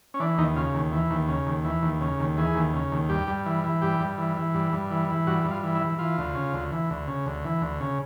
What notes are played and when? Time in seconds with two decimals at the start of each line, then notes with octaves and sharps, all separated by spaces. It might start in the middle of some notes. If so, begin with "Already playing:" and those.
0.14 C#4
0.20 E3 D4
0.38 D#2 D#4
0.56 C#3 F4
0.74 D#2
0.92 E3
1.10 D#2
1.28 C#3
1.46 D#2
1.64 E3
1.83 D#2
2.01 C#3
2.19 D#2
2.37 E3 G#4
2.55 D#2
2.73 C#3
2.92 D#2
3.09 G2 G4
3.27 G2
3.46 E3
3.64 E3
3.81 G2 G4
4.00 G2
4.18 E3
4.37 E3
4.54 G2
4.72 G2
4.90 E3
5.09 E3
5.27 G2 F#4
5.44 G2
5.51 F4
5.63 E3
5.75 E4
5.82 E3
5.99 E3 F4
6.18 D2
6.35 C#3
6.53 D2
6.71 E3
6.90 D2
7.08 C#3
7.26 D2
7.45 E3
7.62 D2
7.81 C#3